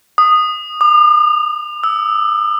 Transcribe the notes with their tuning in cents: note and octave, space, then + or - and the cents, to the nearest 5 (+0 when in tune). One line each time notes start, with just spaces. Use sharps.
D#6 -10
D6 +45
E6 -10